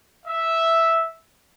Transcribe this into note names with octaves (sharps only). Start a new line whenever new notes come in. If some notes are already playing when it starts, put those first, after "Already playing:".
E5